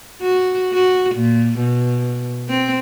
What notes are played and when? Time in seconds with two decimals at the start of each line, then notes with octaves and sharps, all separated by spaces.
0.22 F#4
0.73 F#4
1.15 A#2
1.59 B2
2.49 C4